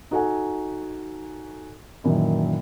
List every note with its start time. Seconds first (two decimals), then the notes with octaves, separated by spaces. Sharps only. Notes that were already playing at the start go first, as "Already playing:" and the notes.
0.11 D#4 F#4 A4 F#5 G#5
2.04 F#2 A#2 D#3 E3